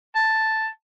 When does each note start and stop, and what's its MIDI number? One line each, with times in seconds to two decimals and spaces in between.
0.15 0.68 81